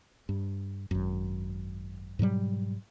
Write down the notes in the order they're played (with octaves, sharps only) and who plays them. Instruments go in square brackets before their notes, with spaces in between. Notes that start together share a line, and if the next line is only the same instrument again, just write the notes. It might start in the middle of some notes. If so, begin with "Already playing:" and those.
[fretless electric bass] G2
G#1 F#2
G#2 B2 F#3 G3